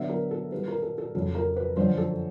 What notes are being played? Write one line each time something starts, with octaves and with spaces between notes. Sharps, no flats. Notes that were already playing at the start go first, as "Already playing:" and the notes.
Already playing: D3 F#3 B3 E5
A#4
A4
G2 D#3 G3 B4
A#4
A4
A4
F2 C#3 F#3 A4
A#4
B4
F#2 D3 F3 C5
A4